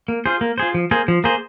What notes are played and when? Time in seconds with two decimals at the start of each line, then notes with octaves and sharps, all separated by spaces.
0.08 A#3
0.26 F4 G#4 C5
0.41 A#3
0.58 F4 G#4 C5
0.74 F3
0.91 A#3 G#4 C5
1.08 F3
1.24 A#3 G#4 C5